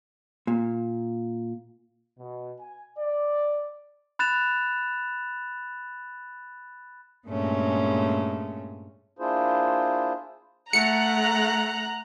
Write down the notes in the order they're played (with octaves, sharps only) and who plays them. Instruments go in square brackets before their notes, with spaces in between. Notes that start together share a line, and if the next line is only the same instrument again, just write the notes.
[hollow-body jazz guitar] A#2
[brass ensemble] B2
G#5
D5
[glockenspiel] B5 F#6 A6 E7 F7
[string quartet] G2 A#2 G#3 A3 C#4
[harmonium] A#3 D4 E4 F4 G#4 C5
[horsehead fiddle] A3 [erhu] F#5 [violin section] A#5 F#6 [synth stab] C#7